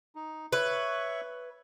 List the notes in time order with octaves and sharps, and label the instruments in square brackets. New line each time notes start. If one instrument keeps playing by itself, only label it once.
[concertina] D#4
[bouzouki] B4 [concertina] C#5 E5 C#6